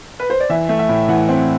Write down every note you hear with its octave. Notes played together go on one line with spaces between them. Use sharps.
B4
C5
D5
E3 E5
A3
E5
A2
E3 F#5
C4